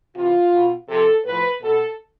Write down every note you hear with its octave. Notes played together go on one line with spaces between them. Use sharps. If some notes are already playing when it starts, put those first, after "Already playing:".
C3 E3 F4
B2
C3 F3 A4
A2 F3 B4
B2 A4